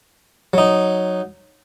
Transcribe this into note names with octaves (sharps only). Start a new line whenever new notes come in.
F#3 D#4